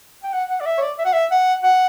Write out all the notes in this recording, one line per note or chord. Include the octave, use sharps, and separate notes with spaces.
G5
F#5
F#5
D5
E5
C#5
D5
E5
F#5
E5
F#5
F#5